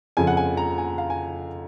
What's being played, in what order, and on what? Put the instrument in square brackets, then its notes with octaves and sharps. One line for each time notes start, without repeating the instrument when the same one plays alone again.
[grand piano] F2 C#3 F3 G#5
F#5
G#5
A#5
G#5
F5
G#5